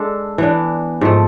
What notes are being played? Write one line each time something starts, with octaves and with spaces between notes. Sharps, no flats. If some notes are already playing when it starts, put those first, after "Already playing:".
Already playing: G#3 D4 A4
E3 B3 D4
G#2 F3 A3